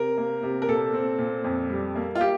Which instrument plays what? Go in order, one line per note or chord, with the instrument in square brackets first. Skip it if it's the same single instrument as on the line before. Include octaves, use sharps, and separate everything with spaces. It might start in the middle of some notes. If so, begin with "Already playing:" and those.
Already playing: [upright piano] C3 A#4
A#3
C3
A#4
A#2 A4
C4
A#2
F2
G3
A#3
F4
G4